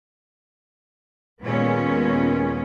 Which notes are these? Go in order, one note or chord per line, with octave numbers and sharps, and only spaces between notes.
D#2 A#2 G#3 B3 C#4